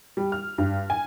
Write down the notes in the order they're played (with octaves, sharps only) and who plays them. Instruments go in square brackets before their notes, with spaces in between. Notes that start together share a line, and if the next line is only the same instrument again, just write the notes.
[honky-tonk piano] G3
F6
G2
G#5